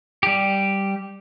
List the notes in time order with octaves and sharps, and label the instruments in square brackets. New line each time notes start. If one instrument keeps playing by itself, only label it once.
[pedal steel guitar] G3 G4